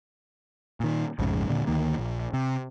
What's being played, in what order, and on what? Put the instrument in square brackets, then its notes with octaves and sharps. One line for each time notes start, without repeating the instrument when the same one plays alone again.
[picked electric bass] A#2 D#3
A#1 F2 G#2 C#3
D#1 A#2 D3
D2 D#3 A#3
A#1
C3